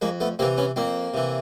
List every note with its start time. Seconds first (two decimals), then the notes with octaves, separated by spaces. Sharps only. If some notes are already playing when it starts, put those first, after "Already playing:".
0.01 F2 G#3 A#3
0.20 A3 B3
0.39 C3 E3 A#3 C4
0.58 B3 C#4
0.76 F2 A#3 C4
1.14 C3 E3